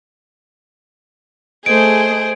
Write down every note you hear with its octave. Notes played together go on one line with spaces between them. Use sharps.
A3 G#4 C5 D#5 D7